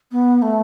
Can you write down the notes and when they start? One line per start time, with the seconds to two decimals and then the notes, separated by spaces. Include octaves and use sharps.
0.11 B3
0.42 A3